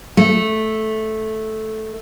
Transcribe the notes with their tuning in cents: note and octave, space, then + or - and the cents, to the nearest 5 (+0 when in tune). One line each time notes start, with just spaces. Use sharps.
A3 -10